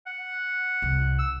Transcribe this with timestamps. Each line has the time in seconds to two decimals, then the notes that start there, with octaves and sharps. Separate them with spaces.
0.07 F#5
0.82 C2
1.19 E6